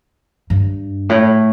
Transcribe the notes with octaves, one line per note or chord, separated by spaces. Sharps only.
G2
A2